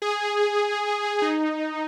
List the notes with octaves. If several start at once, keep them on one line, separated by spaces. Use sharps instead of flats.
G#4
D#4